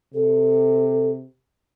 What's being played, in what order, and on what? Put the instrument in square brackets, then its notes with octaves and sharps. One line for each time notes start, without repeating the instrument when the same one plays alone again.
[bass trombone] C3 [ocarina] A4